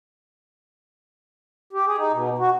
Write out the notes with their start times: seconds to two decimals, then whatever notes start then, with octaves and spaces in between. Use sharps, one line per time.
1.73 G4
1.86 G#4
1.97 D#4
2.12 B2
2.38 F#4